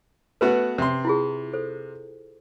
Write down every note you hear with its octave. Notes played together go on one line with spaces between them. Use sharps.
A3 B3 F#4 B4
C3 C6
E4 F4 G#4
A4 C5